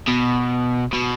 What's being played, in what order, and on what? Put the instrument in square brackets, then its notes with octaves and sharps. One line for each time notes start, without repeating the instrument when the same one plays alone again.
[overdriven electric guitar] B2
B2